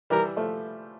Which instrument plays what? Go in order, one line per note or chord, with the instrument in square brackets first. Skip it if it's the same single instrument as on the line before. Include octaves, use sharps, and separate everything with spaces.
[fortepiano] E3 G3 [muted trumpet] A#4
[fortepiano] F3 A3